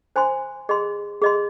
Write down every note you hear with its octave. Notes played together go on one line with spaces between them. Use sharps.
C5 G#5 C6
G#4 D#5 C6
G#4 D#5 C6